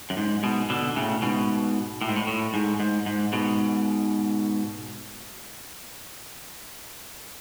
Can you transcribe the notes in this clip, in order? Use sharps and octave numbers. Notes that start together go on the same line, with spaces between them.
F#2
G#2
G#2 B2
B2 D3
A2 C#3
G#2 B2
A2
G#2
A2
A2
G#2
G#2
G#2
G#2 B2